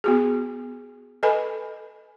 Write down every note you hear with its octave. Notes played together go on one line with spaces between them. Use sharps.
B3 F#4 G#4
A4 B4 D#5 G#5 B5